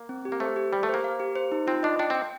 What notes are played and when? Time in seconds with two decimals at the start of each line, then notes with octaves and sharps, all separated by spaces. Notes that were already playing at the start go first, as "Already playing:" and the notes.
Already playing: A#3
0.09 C4
0.25 G4
0.32 A#3
0.40 A3 C5
0.56 G4
0.72 G3 G4
0.83 A3
0.89 A#3 C5
1.04 F5
1.20 G4
1.36 C5
1.52 D#4
1.67 C4 F4
1.83 D4 D#5
1.99 D4 G5
2.10 C4 G5